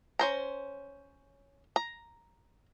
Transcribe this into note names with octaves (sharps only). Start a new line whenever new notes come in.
C#4 C5 A#5
A#5